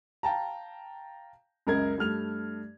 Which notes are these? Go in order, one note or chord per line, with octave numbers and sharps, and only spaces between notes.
F5 G5 A5 A#5
C#2 F#2 A#4 D#5 G#6
G2 A3 F6 F7